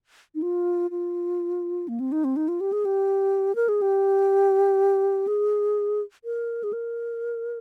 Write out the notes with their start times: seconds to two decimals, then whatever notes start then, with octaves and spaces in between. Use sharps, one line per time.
0.35 D#4
0.42 F4
0.91 F4
1.88 A#3
2.00 C4
2.12 D#4
2.24 C4
2.36 D#4
2.48 F4
2.60 G4
2.72 G#4
2.85 G4
3.55 A#4
3.69 G#4
3.82 G4
5.27 G#4
6.24 A#4
6.63 G#4
6.73 A#4